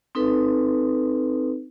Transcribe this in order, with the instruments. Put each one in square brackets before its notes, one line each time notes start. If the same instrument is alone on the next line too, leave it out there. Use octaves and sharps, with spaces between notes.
[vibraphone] C4 D#4 A4 B4